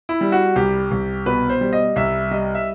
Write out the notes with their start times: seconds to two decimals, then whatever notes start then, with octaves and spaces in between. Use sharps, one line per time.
0.09 E4
0.21 G3
0.32 F#4
0.56 C2 G4
0.91 C2
1.26 B2 B4
1.49 C5
1.61 G3
1.73 D#5
1.96 C2 E5
2.31 G3 D#5
2.55 E5